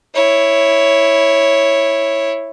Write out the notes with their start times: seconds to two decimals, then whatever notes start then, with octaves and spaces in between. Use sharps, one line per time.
0.15 E4 C#5